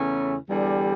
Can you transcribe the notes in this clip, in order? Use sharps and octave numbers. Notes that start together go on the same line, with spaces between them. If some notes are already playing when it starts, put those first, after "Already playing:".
Already playing: E2 C#3 E3 A3 C#4
E2 D3 G3